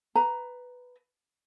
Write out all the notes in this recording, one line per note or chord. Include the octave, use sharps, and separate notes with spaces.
B4 A#5